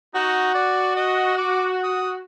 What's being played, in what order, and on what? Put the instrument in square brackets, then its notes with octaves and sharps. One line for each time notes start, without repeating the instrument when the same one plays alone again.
[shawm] D#4 [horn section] F#4
[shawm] D5
D#5
D6
D#6